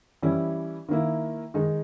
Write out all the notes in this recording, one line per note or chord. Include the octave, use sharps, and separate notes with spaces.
E3 G3 C#4 E4
D#3 A#3 E4
D#3 G#3 D#4